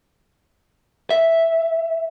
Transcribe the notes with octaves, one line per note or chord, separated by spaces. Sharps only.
E5